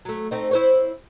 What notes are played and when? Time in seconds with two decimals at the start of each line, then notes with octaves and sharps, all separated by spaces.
0.05 F#3 A3
0.31 A3 C4 D#4
0.51 E4 C5 C#5